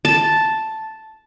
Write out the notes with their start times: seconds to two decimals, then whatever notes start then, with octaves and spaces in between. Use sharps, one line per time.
0.05 A5